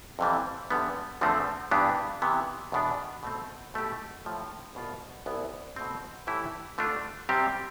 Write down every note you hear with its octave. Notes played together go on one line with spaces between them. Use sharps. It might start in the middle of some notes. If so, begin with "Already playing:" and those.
F2 C3 E3 G3
E2 D3 G3 B3
E2 D3 F3 A3 C4
G2 E3 B3 D4 G4
C3 E3 B3
E2 B2 B3 D4
B2 A3 C4
B2 A3 E4 G4
A2 F3 A3
C2 B2 B3 F4
C2 B2 G3 B3 E4
B2 A3 C4
A2 E3 A3 E4 G4
D3 A3 D4 F4
C3 G3 C4 G4